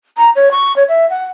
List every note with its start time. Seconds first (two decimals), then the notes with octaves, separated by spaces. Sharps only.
0.17 A#5
0.36 C#5
0.51 C#6
0.76 C#5
0.89 E5
1.10 F#5